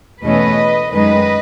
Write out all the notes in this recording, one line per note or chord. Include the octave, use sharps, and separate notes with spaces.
E2 B2 A3 C#4 B4 D#5
F#2 D#3 G#3 B4 D#5